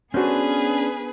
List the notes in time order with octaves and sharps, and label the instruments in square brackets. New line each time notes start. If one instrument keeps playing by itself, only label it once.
[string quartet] B3 G#4 B4 [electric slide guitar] C#4 D4 [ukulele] F#4 A4 C5